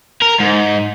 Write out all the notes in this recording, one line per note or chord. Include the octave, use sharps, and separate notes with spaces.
A#4
G#2